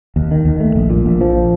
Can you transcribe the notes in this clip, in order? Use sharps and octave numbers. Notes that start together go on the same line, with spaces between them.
D#2
D#3
D#2
A3
A#1
A#2
A#1
F3